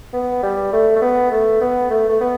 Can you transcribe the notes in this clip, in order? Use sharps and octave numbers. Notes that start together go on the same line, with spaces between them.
B3
G3
A3
A3
B3
A3
B3
A3
A3
B3